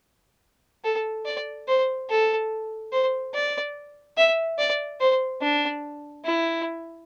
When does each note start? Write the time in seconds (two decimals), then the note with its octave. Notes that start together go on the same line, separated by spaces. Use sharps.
0.84 A4
1.25 D5
1.68 C5
2.09 A4
2.92 C5
3.34 D5
4.17 E5
4.58 D5
5.00 C5
5.42 D4
6.25 E4